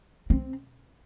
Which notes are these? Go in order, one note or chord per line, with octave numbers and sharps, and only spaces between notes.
C4